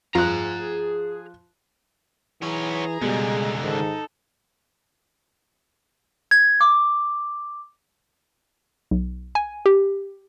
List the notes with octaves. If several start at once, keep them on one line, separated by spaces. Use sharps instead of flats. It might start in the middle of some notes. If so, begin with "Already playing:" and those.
F2 F3 F4 G#4 A#5 F#6 A#6
E3 B3 G#4 C#5 A#5
C#2 B2 D3 G3 G#3
G#2 D#3 D#4 A4
G#6
D6
B1
G#5
G4